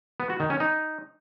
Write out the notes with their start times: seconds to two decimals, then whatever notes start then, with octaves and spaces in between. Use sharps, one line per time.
0.20 B3
0.30 F#4
0.40 D#3
0.50 C#4
0.60 D#4